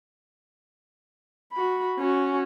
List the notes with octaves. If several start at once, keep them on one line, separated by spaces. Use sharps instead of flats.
F#4 B5
C#4 F#4